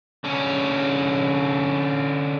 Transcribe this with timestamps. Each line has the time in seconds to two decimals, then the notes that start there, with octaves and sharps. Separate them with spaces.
0.24 D3 C#4